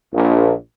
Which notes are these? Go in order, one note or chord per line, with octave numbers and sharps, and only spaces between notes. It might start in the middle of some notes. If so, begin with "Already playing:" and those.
A#1